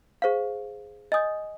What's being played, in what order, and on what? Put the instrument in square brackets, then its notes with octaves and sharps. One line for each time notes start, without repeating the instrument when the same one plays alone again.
[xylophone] G#4 C5 F5
D#5 G#5 D#6 G6